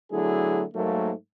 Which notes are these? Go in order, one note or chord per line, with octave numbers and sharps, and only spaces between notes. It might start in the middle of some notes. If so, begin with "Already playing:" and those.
D3 F#3 A3 B3 E4 G#4
G#2 F#3 A3 A#3